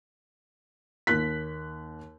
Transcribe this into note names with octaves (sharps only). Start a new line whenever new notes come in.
D#2 F#6 B6